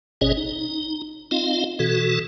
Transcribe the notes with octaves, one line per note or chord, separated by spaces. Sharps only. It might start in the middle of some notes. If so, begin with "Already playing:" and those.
G#1 B2 C#4 G#4 C#5 D#5
D#4
C4 D#4 F4 D#5 F5
B2 E3 F#4 A4